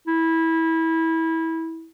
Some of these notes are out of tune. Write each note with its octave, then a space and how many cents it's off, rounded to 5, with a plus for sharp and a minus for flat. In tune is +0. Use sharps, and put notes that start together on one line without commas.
E4 -20